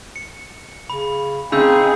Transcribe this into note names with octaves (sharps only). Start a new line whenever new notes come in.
C#7
C#3 B5
C#3 C4 D#4 G#4 B5 E6 G6